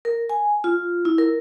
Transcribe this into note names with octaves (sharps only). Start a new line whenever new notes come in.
A#4
G#5
F4
E4
A#4